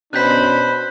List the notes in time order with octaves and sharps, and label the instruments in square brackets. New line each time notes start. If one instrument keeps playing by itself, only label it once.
[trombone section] B2 C#4 D4 [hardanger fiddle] C5 B5 [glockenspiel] F#6 G6 B6